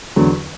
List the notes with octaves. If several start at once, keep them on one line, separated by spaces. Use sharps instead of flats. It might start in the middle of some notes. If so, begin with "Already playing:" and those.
E2 D3 F#3